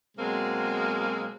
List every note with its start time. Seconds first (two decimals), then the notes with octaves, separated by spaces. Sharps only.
0.18 B2 F#3 G#3 A#3 C4